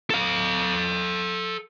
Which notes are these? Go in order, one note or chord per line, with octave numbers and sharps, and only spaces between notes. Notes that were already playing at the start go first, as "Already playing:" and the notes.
A4 F5